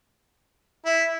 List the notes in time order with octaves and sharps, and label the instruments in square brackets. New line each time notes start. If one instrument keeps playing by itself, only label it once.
[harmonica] E4